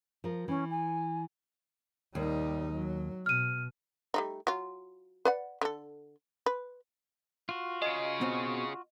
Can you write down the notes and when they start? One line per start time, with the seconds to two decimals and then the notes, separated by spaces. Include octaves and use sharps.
0.24 F3 A#4
0.48 E3 C#4
0.70 G#5
2.15 D#2 G3 D#4
2.73 F#3
3.26 B2 F6 D#7
4.14 G3 A3 D#4
4.47 F#3 F4
5.25 B4 D5 F#5
5.61 D3 A4
6.46 B4
7.49 F4 F#4
7.82 C#3 G#4 D#5
8.21 B2 C4 C#4